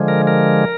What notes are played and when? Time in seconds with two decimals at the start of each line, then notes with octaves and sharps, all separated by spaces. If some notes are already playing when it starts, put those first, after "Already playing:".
Already playing: D3 F3 G#3
0.08 A#4
0.27 A#4